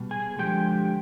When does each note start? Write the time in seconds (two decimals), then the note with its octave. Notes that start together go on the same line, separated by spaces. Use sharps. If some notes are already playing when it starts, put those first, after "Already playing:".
Already playing: B2 G3
0.11 G#4 G#5
0.38 D3 F3 G#3 G4 G5